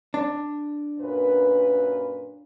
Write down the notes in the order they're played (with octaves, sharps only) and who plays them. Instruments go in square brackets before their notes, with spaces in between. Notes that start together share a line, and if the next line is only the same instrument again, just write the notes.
[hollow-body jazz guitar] D4
[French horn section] F#2 A#2 B4